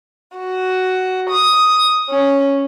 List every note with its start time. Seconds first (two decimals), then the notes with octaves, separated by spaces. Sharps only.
0.36 F#4
1.30 D#6
2.09 C#4